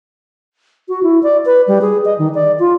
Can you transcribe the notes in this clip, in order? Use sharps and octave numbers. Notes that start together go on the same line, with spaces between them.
F#4
E4
D5
B4
G3
G#4
D#5
D#3
D5
F4